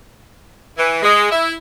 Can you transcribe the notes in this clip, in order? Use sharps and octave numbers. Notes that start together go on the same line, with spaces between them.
E3
G#3
E4